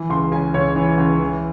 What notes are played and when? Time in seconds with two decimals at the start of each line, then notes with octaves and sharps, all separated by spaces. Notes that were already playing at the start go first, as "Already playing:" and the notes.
Already playing: E3
0.09 C#2 C6
0.32 C#3 G#5
0.54 C#2 C#5
0.76 E3
0.98 C#2
1.20 E3